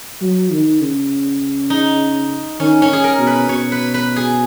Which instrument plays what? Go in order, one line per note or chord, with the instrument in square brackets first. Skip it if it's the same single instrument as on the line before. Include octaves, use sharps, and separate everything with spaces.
[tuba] F#3
D#3
C#3
[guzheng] D#4
[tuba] D#3 [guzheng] C#4
[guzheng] C#4
G#4
A#4
[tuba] B2
[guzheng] B4
[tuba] B2 [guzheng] C#5
[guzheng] B4
B4
G#4